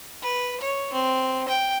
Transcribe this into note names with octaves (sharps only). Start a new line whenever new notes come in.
B4
C#5
C4
G5